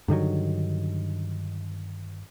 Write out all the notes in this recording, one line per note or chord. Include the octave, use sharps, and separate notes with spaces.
G2 D3 D#3 F#3